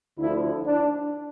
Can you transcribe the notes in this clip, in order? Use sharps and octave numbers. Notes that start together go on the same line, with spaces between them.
D2 D3 F3 E4
D4